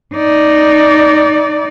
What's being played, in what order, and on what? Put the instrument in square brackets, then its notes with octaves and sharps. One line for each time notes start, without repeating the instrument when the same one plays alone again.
[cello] D#4 D5